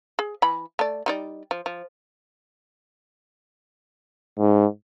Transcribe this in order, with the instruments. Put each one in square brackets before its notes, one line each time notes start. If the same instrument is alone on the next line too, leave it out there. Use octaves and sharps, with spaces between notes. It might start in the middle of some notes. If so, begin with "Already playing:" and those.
[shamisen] G#4
E3 B5
A3 D5
G3 D#4 D5
F3
F3
[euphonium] G#2